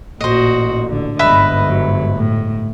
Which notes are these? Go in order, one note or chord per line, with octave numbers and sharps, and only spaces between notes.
A1 A#2 F#4 C5 D#5
D3
G1 G#2 B4 D#5 E5 B5
F#3
A2